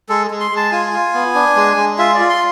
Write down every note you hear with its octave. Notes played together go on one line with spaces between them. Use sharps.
G#3 A4
G#3
C6
G#3
A5
F4 G#5
F4
B3
D4
G#3
G#3
F4 E5
D5
F4
C6